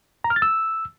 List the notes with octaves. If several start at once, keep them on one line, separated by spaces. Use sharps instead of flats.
A#5
F6
A6
E6